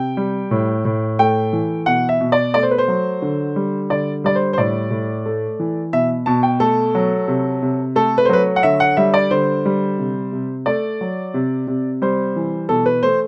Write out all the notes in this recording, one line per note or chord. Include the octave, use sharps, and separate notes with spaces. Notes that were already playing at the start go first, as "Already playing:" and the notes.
Already playing: C3 G5
G3
A2
A2
A3 G5
E3
B2 F#5
E5
B2
D5
A3 D5
C5
B4
C5
F#3
D3
G3
D3 D5
G3 D5
C5
C5
A2 D5
A2
A3
E3
B2 E5
B2 A5
G5
A3 A4
F#3
C3
C3
A3 A4
B4
C5
F#3 B4
F#5
D3 E5
F#5
G3 E5
D5
D3 C5
G3
C3
C3
A3 D5
F#3
C3
C3
G3 C5
E3
B2 A4
B4
A3 C5